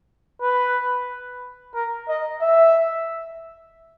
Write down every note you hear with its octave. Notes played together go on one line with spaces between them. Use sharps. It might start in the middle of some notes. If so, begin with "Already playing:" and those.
B4
A#4
D#5
E5